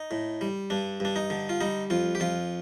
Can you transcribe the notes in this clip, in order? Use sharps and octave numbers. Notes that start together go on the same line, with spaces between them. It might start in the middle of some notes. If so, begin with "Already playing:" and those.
Already playing: D#4
A2
G3
G2 D4
G2 D4
D#4
D3
F4
G3 D#4
F2 F4
G4
F2 F4